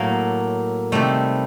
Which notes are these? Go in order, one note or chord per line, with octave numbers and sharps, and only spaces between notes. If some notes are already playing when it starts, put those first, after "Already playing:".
Already playing: A2 F#3 A3 A#3
C3 D#3 G3 A3